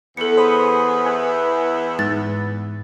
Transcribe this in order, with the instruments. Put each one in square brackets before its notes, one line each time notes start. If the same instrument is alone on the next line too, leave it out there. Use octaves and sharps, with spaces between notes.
[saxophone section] E2 B3 [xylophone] A4 C#7
[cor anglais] G#4 [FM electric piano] C5 B5
[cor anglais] E4 [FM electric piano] G#5
[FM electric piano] G#2 [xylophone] A6